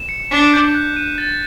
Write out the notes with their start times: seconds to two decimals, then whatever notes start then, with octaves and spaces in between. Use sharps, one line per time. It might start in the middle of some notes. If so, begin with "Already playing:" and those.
Already playing: E7
0.09 C#7
0.31 D4 B6
0.53 G6
0.74 F#6
0.96 D#7
1.18 A6